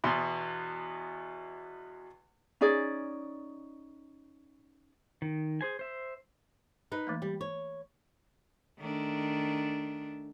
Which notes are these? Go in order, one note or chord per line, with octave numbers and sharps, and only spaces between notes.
E2 B2 C6
C#4 D#4 G#4 D5
D#3
G#4 C5 G#5
C5 E5
D#4 A#4 B4
E3 A3 A#3
G3
C#5
D#3 A3 D4